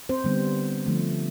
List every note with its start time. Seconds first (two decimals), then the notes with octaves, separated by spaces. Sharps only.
0.09 C4 C5
0.24 D3 G3 B3
0.86 D3 F3 A3